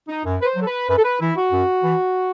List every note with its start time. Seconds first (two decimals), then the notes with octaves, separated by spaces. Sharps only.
0.08 D#4
0.25 F#2
0.41 B4
0.46 C5
0.56 F#3 A4
0.67 B4
0.88 F#2 B4
0.97 A4
1.03 B4
1.20 E3 E4
1.36 F#4
1.52 F#2
1.84 E3